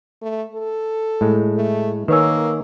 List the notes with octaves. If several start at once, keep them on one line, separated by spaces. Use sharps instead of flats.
A3
A4
A2 G#3
A3
D#3 A#3 B4 C#5 G#5 E6